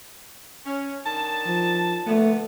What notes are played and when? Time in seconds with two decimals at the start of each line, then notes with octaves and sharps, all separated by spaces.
0.66 C#4
1.06 D#3 D4 A5
1.47 F3
2.07 A#2 D3 A3 B3